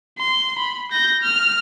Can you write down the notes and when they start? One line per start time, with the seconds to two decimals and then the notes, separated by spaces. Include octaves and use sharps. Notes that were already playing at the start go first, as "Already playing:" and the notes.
0.19 C6
0.59 B5
0.92 G6 A#6
1.23 F6